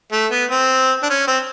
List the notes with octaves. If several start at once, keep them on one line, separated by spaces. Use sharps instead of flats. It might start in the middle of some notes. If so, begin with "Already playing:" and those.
A3
B3
C4
D4
C#4
C4